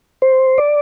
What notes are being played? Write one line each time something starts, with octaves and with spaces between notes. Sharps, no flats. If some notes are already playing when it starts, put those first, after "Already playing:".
C5
D5